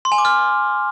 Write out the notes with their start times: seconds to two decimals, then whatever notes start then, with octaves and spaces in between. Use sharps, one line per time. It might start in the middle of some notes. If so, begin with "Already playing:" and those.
0.05 C6
0.12 G#5
0.18 D6
0.25 F6